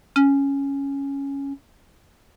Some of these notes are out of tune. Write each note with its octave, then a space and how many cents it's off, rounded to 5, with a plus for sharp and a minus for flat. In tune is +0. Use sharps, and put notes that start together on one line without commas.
C#4 +0